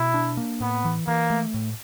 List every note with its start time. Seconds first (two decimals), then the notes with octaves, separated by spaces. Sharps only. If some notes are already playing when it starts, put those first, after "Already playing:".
Already playing: B2 E4
0.14 D4
0.37 A#3
0.60 A2 B3
0.85 E3
1.07 E3 A#3
1.30 A3
1.54 A2